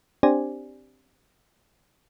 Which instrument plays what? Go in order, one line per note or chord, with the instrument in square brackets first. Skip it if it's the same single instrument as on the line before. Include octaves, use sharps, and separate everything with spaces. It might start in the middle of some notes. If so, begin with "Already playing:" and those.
[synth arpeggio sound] C4 D4 G4 C5 D5 G#5